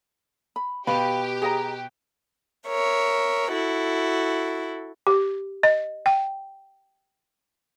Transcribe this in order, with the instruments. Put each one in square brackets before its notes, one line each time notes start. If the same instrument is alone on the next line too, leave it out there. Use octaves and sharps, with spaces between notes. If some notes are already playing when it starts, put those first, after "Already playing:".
[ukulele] B5
[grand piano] B2 B4 [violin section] G4 [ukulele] F5 B5
[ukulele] G#4 D#5 A#5
[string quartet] A#4 C#5 E5
E4 F#4 A4
[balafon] G4
D#5
G5